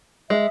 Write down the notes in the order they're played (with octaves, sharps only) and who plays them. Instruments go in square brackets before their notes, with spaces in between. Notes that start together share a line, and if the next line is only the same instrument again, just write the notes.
[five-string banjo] G#3 [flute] E5